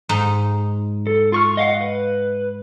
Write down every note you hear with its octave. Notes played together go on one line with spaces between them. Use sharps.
G#2 D#4
A4
F4 C#6 F6
D#5 F5 F#5
B4